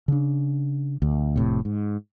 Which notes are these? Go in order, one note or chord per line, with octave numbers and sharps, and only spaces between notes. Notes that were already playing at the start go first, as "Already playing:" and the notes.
C#3 D4
D2
F1 A2 C3
G#2